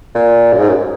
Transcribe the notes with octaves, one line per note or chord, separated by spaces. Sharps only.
A#2
F#2
G#2
F#2